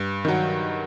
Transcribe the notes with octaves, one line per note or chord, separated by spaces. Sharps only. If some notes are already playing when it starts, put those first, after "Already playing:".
Already playing: G2
D#3 F#3